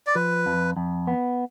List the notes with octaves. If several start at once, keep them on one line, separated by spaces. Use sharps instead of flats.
D5
F3 B4
F2
F2
B3